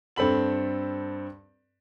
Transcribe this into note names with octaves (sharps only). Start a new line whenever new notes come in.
G2 C4 A4 B5 F#7